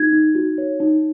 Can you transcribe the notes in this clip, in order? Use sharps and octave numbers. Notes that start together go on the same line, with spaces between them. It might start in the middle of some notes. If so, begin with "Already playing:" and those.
Already playing: D#4 G#6
D#4
F#4
C#5
D#4